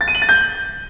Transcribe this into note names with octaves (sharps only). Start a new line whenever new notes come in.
A6
D#7
F#7
A6
G6